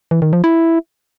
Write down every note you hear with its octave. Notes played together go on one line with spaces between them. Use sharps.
E3
D#3
F3
E4